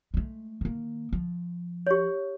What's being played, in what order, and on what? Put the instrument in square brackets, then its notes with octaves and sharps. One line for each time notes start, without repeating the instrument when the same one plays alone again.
[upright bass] G#3 A3
D#3 A#3
F3
[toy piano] G4 C#5